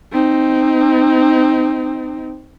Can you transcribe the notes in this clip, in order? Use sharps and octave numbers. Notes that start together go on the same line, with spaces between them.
C4 D#4